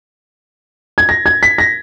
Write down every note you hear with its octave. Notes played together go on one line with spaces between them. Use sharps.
G#6
A#6
G#6
B6
A#6